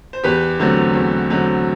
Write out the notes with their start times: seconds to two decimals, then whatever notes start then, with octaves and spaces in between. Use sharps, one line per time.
0.13 C5
0.24 E2 G4 B4
0.59 D3 F#3 A3 C4
0.94 E2
1.30 D3 F#3 A3 C4